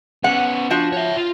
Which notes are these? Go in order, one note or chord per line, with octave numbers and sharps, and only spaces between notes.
B3 C#4 F#5
F3 D4 F#4
C#5 E5
F4